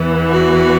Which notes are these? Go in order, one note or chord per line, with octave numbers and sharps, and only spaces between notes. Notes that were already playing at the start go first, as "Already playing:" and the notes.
Already playing: E2 E3 B3
F#4